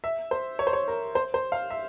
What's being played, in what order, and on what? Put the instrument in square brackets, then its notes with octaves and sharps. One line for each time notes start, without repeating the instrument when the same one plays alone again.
[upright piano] E5
C5
C#5
C5
C#5
A#4
C5
C5
F5
E5